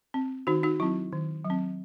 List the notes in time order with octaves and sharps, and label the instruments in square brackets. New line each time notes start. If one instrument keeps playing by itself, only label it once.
[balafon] C4
D#3 D#4 F#4
D#4 F#4
F#3 C4 E4
D#3
F#3
C4